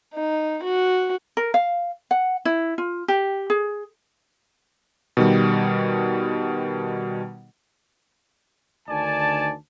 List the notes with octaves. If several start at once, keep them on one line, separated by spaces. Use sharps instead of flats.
D#4
F#4
A#4
F5
F#5
E4
F4
G4
G#4
B2 D#3 G3
D2 D3 D#3 D5 G#5 A5